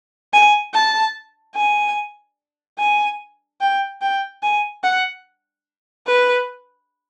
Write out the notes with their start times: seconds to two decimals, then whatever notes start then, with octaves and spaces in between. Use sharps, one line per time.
0.33 G#5
0.74 A5
1.55 G#5
2.79 G#5
3.61 G5
4.01 G5
4.43 G#5
4.84 F#5
6.07 B4